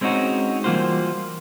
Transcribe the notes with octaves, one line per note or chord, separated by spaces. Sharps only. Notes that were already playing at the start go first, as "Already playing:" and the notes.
G#3 C4 C#4 D#4 F#4
E3 G3 A#3 F4 F#4 C5